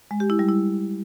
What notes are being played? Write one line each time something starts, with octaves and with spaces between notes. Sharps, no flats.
G#3
G4
E4
G3
E4